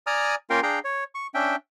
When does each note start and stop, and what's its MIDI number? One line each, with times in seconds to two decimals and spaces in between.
0.07 0.35 74
0.07 0.35 80
0.07 0.35 82
0.07 0.35 87
0.07 0.35 89
0.50 0.60 58
0.50 0.60 61
0.50 0.60 65
0.50 0.60 70
0.50 0.60 77
0.50 0.60 79
0.63 0.79 62
0.63 0.79 68
0.63 0.79 77
0.63 0.79 79
0.63 0.79 82
0.84 1.04 73
1.15 1.27 85
1.34 1.56 61
1.34 1.56 62
1.34 1.56 76
1.34 1.56 79